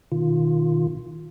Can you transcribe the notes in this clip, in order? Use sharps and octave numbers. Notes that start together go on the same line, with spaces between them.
B2 D#3 F4